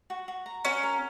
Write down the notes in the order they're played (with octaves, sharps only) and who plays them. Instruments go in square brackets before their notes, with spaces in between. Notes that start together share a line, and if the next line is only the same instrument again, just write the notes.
[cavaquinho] F#4
F#4
A#5
[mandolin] C#4 [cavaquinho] F#4
[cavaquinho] A#4